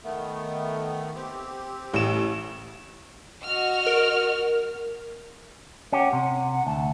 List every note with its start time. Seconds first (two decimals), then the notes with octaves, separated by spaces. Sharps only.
0.04 D#3 A3 B3
1.15 C4 G4
1.93 A1 E7
3.44 F#4 D#5 F6
3.86 A#4
5.92 C#4 G4 F#5
6.13 C3
6.51 F#5
6.67 D2 A5